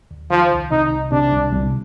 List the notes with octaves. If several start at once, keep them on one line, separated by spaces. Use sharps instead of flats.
D#2
D#3 F3
C2
C3 D#4
C2
C3 D4
C2
C2